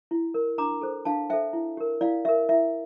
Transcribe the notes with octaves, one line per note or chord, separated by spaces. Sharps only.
E4
A#4
D4 A#5 D6
A4 C5
D4 F5 A5
A4 C5 E5 G5
E4
G4 A#4
E4 D5 F5
G4 A#4 E5
E4 E5